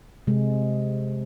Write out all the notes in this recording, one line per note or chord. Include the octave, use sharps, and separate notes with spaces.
C3 G#3